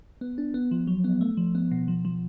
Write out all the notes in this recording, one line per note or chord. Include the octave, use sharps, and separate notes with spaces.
B3
D4
B3
F3
F#3
B3
A3
F3
B3
B2
F3
F3